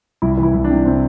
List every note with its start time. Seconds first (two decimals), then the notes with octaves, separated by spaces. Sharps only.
0.22 C2 E4
0.37 E3
0.43 E4
0.54 C2
0.64 D4
0.70 C3
0.85 C3 C4